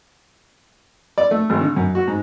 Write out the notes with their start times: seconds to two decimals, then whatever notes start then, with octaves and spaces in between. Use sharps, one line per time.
1.18 D5
1.31 A3
1.50 G#1
1.61 D3
1.76 F#2
1.95 F#4
2.08 G#2